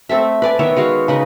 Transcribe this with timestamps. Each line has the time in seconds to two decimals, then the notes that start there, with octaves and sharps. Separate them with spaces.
0.09 A3 C4 A4 E5
0.42 B4 D5 G#5
0.59 D#3 B3 C#5 E5
0.76 G#3 F#4 C#5 F5
1.08 C#3 D#4 B4